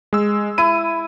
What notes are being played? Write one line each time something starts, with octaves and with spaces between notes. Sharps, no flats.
G#3 E6
E4 D#7